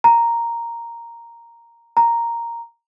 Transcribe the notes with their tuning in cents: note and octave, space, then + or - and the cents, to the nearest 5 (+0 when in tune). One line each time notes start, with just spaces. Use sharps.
A#5 -5
A#5 -5